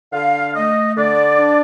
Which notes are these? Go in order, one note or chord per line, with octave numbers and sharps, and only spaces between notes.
D3 F5
A3 D#5
D3 D5
D4